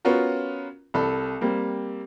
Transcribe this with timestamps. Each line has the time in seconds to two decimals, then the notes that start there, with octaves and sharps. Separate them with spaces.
0.05 B3 C#4 F4 F#4 A#4
0.94 C2 A4 B5
1.41 G3 A#3 C4